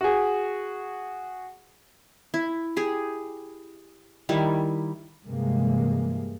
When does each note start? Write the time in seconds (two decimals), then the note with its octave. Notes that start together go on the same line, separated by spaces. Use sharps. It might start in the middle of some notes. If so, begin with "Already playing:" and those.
0.01 F#4 G#4
2.34 E4
2.76 G4 G#4
4.29 D#3 G3 E4
5.25 G2 C3 E3 G#3 A#3